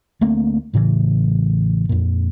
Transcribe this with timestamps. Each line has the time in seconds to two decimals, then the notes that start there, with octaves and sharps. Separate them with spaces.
0.21 D2 A3 A#3 C4
0.74 A1 A2 C#3 E3
1.89 F2 A#2